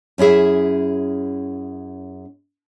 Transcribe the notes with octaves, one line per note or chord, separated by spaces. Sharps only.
F#2 C#4 E4 G#4 E5